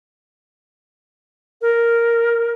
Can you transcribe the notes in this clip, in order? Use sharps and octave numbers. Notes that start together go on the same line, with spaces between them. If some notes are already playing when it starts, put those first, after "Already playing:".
A#4